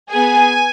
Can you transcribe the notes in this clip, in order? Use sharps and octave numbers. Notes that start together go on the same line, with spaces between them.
B3 G#4 G#5